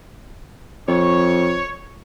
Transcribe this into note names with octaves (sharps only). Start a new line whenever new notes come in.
F2 C#5